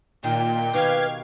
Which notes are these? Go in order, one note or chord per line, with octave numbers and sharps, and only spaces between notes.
A#2 D#3 G5
B2 D#3 G4 B4 F5 G#6